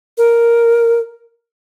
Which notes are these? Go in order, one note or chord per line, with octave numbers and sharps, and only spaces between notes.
A#4